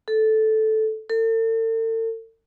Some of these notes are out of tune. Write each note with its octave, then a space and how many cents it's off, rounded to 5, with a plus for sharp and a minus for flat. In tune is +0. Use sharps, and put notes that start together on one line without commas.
A4 -10
A4 +40